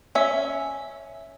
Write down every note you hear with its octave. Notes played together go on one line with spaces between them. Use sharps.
C#4 E5